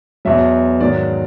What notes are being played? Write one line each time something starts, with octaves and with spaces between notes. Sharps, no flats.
E2 B2 F#3 E5
G#2 D#3 F#3 D5